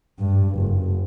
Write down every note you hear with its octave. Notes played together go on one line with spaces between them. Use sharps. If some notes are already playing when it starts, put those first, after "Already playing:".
G2
F#1